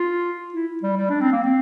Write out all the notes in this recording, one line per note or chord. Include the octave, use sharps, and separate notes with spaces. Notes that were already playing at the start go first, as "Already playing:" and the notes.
Already playing: F4
E4
G3
G3
D4
C4
A#3
C4